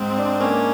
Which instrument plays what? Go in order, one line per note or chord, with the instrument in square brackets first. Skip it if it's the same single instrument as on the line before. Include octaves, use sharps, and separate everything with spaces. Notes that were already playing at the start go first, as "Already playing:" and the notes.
Already playing: [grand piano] G#2 [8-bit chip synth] C4
[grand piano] D4
[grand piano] A#3 [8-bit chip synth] C#4